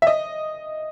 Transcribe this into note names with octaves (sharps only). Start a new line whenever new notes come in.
E5
D#5